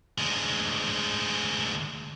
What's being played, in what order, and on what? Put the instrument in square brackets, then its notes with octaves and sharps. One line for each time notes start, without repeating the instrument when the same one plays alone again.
[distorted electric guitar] D2 G#3